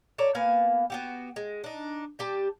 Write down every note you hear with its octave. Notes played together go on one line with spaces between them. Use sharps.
A4 C#5 D5 A#5
A#3 B3 F5 G#5
B3 F#4 G4
G#3
D4 D#4
G3 G4 A5